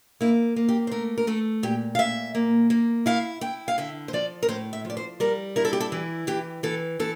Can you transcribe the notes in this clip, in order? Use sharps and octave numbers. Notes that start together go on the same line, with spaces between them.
A#3 E4
A#3
G4
C5
A3 A#4
A#4
A3 A4
A#2 G4
F5
A#2 E5
A#3
A#3
E4 F5
E4 G5
F5
D3 E5
C5
F3 D5
A#4
A2 C5
E5
F3 D5
C5
G3 A#4
E4 A#4
A4
G4
A4
E3
E3 G4
E3 A4
E3 A4